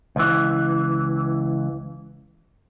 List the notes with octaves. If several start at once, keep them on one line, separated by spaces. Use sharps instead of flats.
C#2 E3